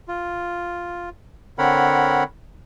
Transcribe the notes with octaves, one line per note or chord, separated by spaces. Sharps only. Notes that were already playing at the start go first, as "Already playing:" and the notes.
F4
D3 C4 A#4 C#5 F#5 B5